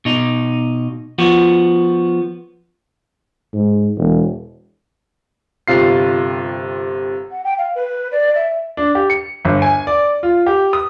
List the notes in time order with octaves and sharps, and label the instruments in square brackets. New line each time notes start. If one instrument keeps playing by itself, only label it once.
[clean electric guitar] B2 D#4
F3 B3 F#4
[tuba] G#2
E1
[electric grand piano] G1 C3 F4 C7
[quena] F#5
G5
F5
B4
D5
E5
[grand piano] D4
G4
C#7
G1
G#5
D5
F4
G4
D#6